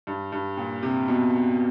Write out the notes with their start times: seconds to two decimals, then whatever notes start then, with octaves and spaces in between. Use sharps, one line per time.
0.07 G2
0.32 G2
0.57 A#2
0.83 C3
1.08 B2